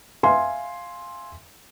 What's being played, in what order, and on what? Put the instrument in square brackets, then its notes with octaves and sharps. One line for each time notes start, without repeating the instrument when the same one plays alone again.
[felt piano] E5 F5 G#5 C6